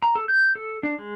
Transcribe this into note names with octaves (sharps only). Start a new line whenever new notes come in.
A#5
A4
G6
A4
D4
G#3